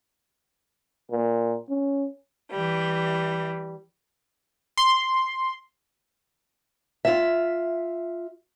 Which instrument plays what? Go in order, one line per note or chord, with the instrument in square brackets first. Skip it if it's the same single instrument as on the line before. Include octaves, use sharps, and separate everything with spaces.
[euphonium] A#2
C#4
[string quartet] E3 G3
[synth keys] C6
[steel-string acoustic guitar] F4 E5